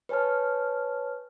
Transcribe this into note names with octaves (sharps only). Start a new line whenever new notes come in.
B4 C#5 G#5 A5 F6